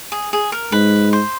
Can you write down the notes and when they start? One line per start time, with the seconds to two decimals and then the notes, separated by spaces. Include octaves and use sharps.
0.12 G#4
0.33 G#4
0.52 A#4
0.72 G#2 B4
1.13 C5